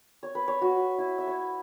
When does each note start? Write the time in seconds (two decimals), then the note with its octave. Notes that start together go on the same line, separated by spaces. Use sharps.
0.23 C#5
0.35 B4
0.48 C#5
0.61 F#4
0.98 E4
1.18 E5
1.27 C#5